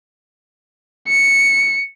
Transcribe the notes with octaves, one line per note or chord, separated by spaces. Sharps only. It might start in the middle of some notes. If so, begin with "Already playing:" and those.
C#7